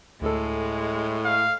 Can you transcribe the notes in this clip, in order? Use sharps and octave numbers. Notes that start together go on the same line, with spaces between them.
D2 A2 G#3 A4
F5